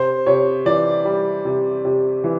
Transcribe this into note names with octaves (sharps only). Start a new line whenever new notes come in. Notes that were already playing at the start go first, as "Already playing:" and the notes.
Already playing: C3 C5
C3 C#5
E3 D5
G3
C3
C3
E3